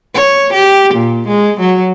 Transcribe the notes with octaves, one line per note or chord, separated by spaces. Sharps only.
C#5
G4
A#2
G#3
F#3